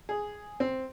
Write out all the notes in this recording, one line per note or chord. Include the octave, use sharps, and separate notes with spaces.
G#4
C4